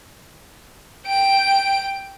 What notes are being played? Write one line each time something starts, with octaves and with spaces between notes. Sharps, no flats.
G5 D7